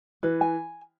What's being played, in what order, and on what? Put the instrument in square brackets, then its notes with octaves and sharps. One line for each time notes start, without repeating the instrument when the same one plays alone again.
[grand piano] E3 [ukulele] B4
[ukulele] G#5